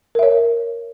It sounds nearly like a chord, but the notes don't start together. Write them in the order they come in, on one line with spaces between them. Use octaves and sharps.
A#4 E5 C#5